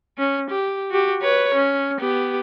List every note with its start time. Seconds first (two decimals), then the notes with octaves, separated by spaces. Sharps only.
0.18 C#4
0.50 G4
0.91 F#4 G4
1.22 B4 C#5
1.54 C#4
2.00 B3 G4